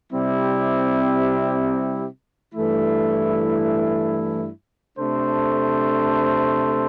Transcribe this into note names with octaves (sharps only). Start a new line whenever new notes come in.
C3 G3 C4 E4 G4
G2 E3 A3 E4
C3 A3 D4 A4 C5